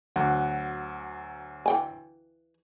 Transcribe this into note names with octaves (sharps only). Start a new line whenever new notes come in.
D2 F#3 F#5
E3 G5 G#5